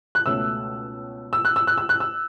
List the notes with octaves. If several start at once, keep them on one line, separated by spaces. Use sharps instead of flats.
F#6
C#2 B2 A3 C#4 E6
E6
F#6
E6
F#6
E6
F#6
E6